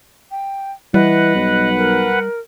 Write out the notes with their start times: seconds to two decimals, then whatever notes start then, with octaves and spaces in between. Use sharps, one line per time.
0.31 G5
0.94 E3 G3 B4 D#5 F#5
1.36 B1
1.77 A#4